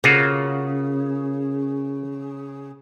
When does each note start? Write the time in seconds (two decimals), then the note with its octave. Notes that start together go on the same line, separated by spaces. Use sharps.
0.04 C#3 A#3 F4 F#4